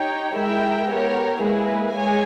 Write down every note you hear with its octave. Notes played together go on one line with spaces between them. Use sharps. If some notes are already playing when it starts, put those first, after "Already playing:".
Already playing: D#4 G4 C#5 G5
G#3 E4 A#4 E5 G5
B3 G4 A#4 C#5
G#3 A#3 E4 G#4 B4
G#3 G#4 C#5 G#5